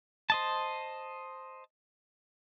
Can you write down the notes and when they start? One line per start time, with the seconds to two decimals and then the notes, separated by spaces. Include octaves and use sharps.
0.30 C5 D#5 A5